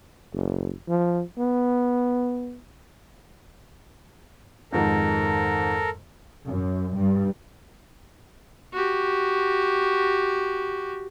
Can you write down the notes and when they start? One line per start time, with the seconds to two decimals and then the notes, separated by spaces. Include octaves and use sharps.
0.33 F#1
0.88 F3
1.38 B3
4.72 F2 G#2 D#3 A4 A#4
6.47 F#2
6.95 G2
8.73 F#4 G4